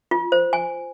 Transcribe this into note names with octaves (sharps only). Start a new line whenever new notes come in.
F4
C5
G#5